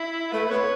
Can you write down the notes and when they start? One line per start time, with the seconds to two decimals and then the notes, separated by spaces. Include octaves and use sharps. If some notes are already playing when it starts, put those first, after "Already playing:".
Already playing: E4
0.32 A3 B4
0.50 B3 C#5